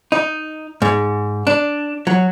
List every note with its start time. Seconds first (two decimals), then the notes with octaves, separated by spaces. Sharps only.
0.12 D#4
0.82 G#2
1.47 D4
2.07 F#3